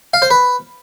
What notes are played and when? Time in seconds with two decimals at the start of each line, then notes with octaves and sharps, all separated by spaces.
0.14 F5
0.22 C5
0.30 B4